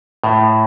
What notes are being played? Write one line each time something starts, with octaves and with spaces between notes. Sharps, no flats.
A2